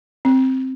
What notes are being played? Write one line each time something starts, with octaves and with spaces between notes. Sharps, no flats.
C4